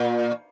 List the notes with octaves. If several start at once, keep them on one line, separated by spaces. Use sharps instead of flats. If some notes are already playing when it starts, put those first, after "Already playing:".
Already playing: A#2